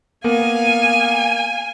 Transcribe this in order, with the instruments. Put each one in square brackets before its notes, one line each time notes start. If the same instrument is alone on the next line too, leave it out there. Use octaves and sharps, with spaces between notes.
[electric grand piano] A#3 B3 A#4 [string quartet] F5 [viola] G#5